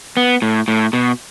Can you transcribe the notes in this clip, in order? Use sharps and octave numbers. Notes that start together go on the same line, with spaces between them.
B3
A2
A2
B2